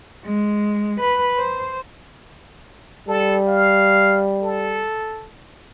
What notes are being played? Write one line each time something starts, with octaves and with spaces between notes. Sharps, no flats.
G#3
B4
C5
G3 A4
F5
A4